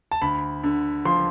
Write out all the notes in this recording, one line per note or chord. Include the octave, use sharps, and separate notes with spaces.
A5
D2 B5
D3
F3 C6